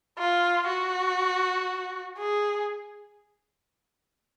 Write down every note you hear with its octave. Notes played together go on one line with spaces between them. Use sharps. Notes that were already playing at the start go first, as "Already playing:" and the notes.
F4
F#4
G#4